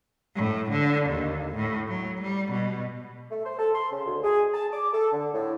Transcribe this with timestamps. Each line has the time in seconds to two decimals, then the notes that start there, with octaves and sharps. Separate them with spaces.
0.36 A2
0.71 D3
1.10 D#2
1.56 A2
1.88 F#3
2.22 G3
2.52 B2
3.31 A3
3.45 C5
3.59 A4
3.75 C6
3.92 C#3
4.06 D2
4.24 G#4
4.54 A5
4.73 D6
4.93 A4
5.12 D3
5.34 A2